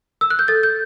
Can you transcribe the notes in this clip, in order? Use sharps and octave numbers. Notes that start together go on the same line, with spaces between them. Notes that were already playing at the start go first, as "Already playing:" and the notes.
E6
F#6
G6
A4 A6
G6